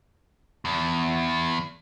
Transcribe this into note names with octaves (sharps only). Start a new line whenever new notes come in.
E2